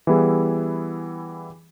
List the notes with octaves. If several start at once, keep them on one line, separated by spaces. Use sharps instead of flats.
E3 G3 B3 E4 G#4